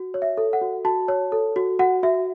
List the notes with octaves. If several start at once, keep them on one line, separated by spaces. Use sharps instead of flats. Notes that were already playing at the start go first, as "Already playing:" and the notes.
Already playing: F#4
C#5
E5
A4
F#5
F#4
F#4 A5
C#5
A4
F#4
F#4 F#5
F#4 E5